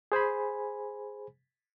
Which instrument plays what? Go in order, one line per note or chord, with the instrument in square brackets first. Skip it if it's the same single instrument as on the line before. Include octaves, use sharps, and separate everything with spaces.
[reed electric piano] G#4 C5 G#5 B5